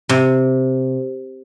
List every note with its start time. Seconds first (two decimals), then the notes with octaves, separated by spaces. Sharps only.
0.09 C3